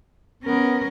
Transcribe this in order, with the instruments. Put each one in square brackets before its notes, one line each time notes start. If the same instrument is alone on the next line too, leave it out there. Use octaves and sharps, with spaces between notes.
[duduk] B3 [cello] C#4 A#4